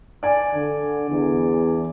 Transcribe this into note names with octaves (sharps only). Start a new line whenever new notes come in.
D5 G#5
D3
E2